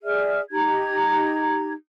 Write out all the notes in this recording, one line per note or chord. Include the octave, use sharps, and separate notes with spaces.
G#4 D5 E5 F6
D#4 G4 A#5 G#6